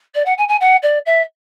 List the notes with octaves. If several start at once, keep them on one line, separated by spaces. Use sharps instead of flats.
D5
F#5
G#5
G#5
F#5
D5
E5